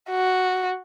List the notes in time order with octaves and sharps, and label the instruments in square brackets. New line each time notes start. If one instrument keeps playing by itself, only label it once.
[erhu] F#4